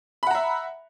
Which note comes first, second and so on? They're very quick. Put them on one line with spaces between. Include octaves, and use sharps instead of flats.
B5 F#5 A#5 E5